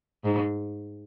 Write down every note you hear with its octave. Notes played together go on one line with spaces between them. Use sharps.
G#2